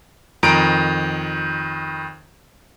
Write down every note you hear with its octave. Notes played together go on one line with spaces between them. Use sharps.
F2 D#3 A#5 D7